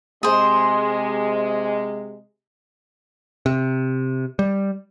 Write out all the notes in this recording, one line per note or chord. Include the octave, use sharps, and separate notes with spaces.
C3 G#3 G#4 C5
C3
G3